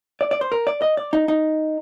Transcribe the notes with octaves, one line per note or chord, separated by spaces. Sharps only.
D5
D5
C5
A#4
D5
D#5
D5
D#4
D#4